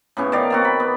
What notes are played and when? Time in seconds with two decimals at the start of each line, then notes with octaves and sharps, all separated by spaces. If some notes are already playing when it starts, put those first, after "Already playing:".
0.17 A2 C#3 B3 C#4
0.32 D#3 D5 F5
0.50 A#3 C4 F#4
0.65 B5
0.80 B3